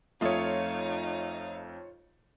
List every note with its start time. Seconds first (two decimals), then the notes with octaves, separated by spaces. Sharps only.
0.21 F2 A3 D#4 F4 C#5 F5 D#6